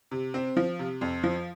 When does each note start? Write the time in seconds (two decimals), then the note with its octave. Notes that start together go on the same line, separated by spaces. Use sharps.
0.11 C3
0.34 C4
0.57 F3
0.79 C3
1.01 F2
1.24 F3